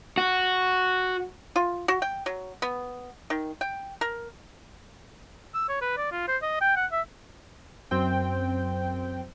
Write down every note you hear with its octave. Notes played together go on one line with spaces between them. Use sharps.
F#4
F4
F#4
G5
F#3
B3
D#3
G5
A#4
E6
C#5
B4
D5
F4
C5
D#5
G5
F#5
E5
F#2 C4 G5